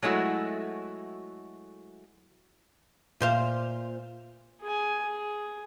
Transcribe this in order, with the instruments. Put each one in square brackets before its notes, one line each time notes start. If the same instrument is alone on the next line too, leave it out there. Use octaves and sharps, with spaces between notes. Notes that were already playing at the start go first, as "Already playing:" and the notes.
[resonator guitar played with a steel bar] F#3 G#3 A3 E4 F#4
[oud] A#2 C5 F5
[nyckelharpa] G#4 G#5
G#4